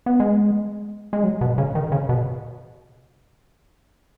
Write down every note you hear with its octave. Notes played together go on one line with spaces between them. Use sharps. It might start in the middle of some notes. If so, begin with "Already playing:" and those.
B3
G#3
G#3
F#3
B2
C#3
D#3
C#3
B2